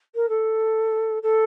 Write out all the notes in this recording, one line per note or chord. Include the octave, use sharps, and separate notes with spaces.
A#4
A4
A4